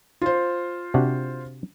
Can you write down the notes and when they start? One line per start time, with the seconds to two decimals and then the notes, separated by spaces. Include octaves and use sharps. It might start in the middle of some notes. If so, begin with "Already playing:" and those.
0.21 F4 C5
0.94 C3 D4 F#4